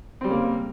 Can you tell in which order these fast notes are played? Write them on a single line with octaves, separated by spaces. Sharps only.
C4 G3 C#3 A#3